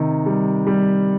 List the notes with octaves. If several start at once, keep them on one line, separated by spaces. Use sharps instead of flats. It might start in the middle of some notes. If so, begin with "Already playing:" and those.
Already playing: C3 D#3
G3
G3